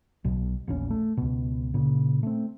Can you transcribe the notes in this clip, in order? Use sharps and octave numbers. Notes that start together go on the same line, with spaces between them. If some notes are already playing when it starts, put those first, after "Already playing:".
B1 B2
E1 A#1 C#4
A3
C#2 B2
A#2 C#3
A3 C4